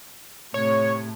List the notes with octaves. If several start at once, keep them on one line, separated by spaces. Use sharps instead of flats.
A2 C3 A3 C#5